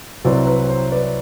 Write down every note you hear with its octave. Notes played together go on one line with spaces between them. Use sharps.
C2 C3 F#3 C4 E4 B4 D5
B4
C5
B4 D5